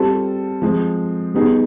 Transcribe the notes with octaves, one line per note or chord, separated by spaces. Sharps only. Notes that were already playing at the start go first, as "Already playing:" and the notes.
Already playing: G3 C4 F4 A4
F3 G#3 C4
G3 B3 D#4 G#4